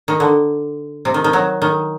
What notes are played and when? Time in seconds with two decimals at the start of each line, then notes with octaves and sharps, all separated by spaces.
0.08 D#3
0.20 D3
1.05 C3
1.14 D#3
1.24 D#3
1.33 F#3
1.62 D#3